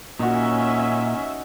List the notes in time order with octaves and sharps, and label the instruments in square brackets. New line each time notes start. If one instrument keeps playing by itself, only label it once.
[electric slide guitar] A#2 [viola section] C#4 E5 [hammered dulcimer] D#4 F#4